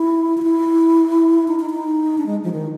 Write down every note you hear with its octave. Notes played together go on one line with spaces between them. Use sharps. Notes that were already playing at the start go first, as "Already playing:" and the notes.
Already playing: E4
F4
E4
D#4
D#4
D#4
D4
G#3
F3
D#3